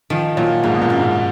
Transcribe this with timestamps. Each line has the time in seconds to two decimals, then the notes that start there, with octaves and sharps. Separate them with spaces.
0.10 D#3 F3
0.37 A#2 F#3
0.63 G#2 A#3
0.74 B2
0.82 A#2
0.90 F#2
0.99 G#2